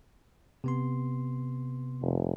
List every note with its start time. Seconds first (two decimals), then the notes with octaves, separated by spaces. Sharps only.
0.64 C3 B3 C6
2.01 F1